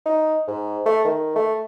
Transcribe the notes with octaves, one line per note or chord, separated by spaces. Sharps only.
D#4
G#2
A3
D#3
A3